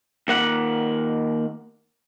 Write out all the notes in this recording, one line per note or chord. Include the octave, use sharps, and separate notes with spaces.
D#2 A#3 F#5